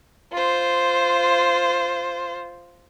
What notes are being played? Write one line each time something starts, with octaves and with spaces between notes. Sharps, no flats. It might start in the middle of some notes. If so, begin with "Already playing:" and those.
F4 C5